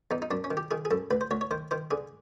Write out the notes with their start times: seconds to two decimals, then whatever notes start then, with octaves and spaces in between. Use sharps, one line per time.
0.11 E2 D#4
0.22 D#4
0.31 F#2 D4
0.44 C#4
0.51 D#3
0.57 G4
0.71 D#3 G#4
0.85 G#4
0.91 F#2 A4
1.11 D2 B4
1.21 C5
1.31 D2 C#5
1.41 C#5
1.51 D#3 C5
1.71 D#3 C5
1.91 D3 G#4